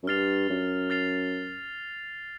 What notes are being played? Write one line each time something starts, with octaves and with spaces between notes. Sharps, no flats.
F#2
G2 F6 A6 C7 F7
F#2
F6 A6 C7 F7